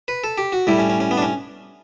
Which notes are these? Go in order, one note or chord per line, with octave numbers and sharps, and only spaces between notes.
B4
A4
G4
F#4
A2 G3 E4
C#4
C#4
C#4
B3
D4
C#4